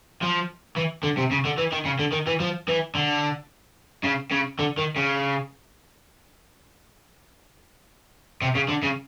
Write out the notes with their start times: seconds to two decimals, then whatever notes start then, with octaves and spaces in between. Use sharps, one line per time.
0.22 F3
0.77 E3
1.03 D3
1.17 C3
1.31 C#3
1.45 D3
1.58 E3
1.72 D#3
1.85 C#3
1.99 D3
2.12 D#3
2.27 E3
2.40 F3
2.68 E3
2.95 D3
4.04 C#3
4.31 C#3
4.59 D3
4.77 D#3
4.96 C#3
8.42 C3
8.55 C#3
8.69 D3
8.83 C#3